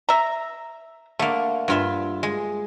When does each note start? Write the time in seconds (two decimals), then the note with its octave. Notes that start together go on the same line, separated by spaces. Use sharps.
0.09 E5 A#5
1.19 D3 A3 A#3
1.68 G2 F4 E5
2.23 G#3